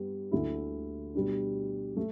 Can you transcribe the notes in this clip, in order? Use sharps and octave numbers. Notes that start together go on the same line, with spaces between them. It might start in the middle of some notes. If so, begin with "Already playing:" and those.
Already playing: G2 G3 B3
D2 D3 A3 E4
B2 G3 D4
A3